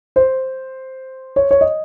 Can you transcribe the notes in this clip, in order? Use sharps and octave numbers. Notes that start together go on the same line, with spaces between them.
C5
C#5
C#5
D#5